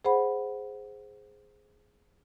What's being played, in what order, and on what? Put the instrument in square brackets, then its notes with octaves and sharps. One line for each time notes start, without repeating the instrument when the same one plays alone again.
[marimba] G#4 C5 F#5 B5